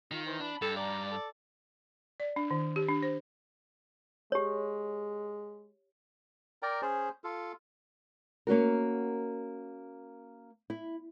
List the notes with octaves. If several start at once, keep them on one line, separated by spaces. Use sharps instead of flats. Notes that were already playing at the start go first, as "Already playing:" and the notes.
D#3 F4
E3 C5
D4 B5
G2 A4
D5 A#5
A4
D5
D4
D#3
G4
D4
C5
G#3 G4 C#5
A#4 D5 G5 A#5
C#4 G#4 C5
F4 A4
A#3 C#4 F#4 A#4
E4